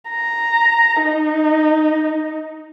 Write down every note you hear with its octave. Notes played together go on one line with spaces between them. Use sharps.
A#5
D#4